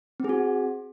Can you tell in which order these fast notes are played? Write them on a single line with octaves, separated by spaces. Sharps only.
C4 G#4 F#4